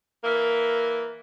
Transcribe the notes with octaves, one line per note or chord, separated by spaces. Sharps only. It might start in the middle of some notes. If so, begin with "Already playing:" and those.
E3 A#3 A#4